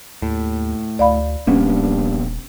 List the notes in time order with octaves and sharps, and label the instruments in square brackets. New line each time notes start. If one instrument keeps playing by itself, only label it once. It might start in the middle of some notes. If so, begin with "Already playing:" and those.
[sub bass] D#2 [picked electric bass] A2
[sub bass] D2 [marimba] D5 F5 B5
[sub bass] D#1 [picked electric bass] A#1 A#3 B3 [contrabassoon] G2 [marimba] C#4